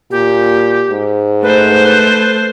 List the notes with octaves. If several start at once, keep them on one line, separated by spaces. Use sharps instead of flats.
A#2 G4
G#2
A3 B4 C5
B4